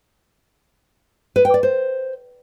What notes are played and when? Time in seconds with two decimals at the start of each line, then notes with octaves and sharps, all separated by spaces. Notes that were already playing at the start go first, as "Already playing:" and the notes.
1.36 B4
1.45 G5
1.54 D5
1.63 C5